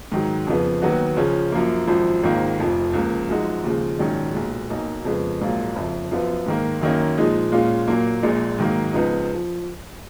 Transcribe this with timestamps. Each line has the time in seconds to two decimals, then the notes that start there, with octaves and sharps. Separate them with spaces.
0.12 G#2 D#3 F#3
0.47 F2 C#3 F3 B3
0.82 D#2 D#3 F#3 B3 F#4
1.16 C#2 C#3 F3 G#3 C#4
1.52 F#2 F3 A#3
1.87 G#1 F#2 F3
2.23 G#1 G#2 D#3 A#3 F4
2.58 F1 F2 F3
2.93 C#2 C#3 F3 A#3
3.29 F#2 F3 G#3 D#4 F#4
3.64 D#2 C#3 F3 G#3
3.99 A#1 G#2 D#3 F#3 C#4
4.34 B1 A#2 G#3
4.70 B1 B2 A#3 D#4
5.05 F2 C#3 G#3 B3
5.41 A#1 G#2 F#3 A#3 F4
5.76 F#1 F2 F3
6.11 F#2 F3 B3 F4
6.46 G#2 D#3 A#3
6.81 F#2 D#3 A#3 C#4
7.18 A#2 F3 G#3 D#4
7.52 A#2 G#3 C#4 F4
7.88 A#2 F#3 A#3
8.23 A#1 A#2 G#3
8.58 G#2 D#3 F#3 A#3
8.93 C#2 C#3 F3 B3 D#4
9.33 F3